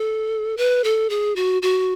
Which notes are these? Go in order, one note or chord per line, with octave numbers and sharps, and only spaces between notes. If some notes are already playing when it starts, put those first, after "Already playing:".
Already playing: A4
B4
A4
G#4
F#4
F#4